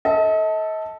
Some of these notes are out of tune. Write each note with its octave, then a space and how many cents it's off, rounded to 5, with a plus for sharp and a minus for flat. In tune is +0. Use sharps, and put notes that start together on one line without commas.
A4 +0 D#5 +40